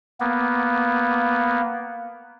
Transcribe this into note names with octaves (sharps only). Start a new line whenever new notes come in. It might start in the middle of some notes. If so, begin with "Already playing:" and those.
A#3 B3